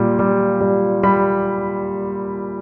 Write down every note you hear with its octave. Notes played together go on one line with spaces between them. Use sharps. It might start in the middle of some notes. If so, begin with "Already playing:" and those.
Already playing: A#2 G3
G3
G3
G3 B5